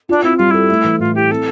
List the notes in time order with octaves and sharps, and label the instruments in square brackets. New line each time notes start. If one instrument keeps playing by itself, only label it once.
[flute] D4 [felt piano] F4
[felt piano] C4 [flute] E4
[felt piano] G3 [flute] F4
[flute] E4 [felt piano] A4
[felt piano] A3
E3
[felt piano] A2 [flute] F4
[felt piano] E4 [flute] G4
[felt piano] C4 [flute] A4